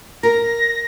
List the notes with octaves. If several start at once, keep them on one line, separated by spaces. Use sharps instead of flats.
A#4 A#6